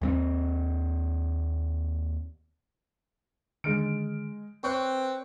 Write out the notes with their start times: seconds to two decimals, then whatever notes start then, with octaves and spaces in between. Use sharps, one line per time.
0.01 D#2 G3 C4
3.64 D3 D#3 G#3 F6 D7
4.64 C4 B4 C#5 C#6 F#6